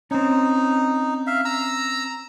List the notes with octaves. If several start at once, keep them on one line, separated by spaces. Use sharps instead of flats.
C4 C#4 D#4
E5 F5
A#5 E6